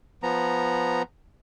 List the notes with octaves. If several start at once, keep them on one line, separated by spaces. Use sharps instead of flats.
F3 B3 A#5